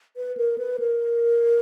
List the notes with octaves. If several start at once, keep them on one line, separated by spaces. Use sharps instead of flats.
B4
A#4
B4
A#4